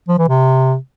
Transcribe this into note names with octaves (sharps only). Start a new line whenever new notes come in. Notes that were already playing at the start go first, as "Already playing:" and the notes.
F3
E3
C3